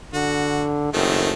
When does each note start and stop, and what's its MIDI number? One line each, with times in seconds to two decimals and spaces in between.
0.14 0.92 50
0.14 0.65 66
0.94 1.33 30
0.94 1.33 51
0.94 1.33 57
0.94 1.33 60